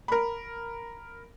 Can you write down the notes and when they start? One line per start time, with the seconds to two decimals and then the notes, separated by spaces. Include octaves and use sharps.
0.08 A#4 B5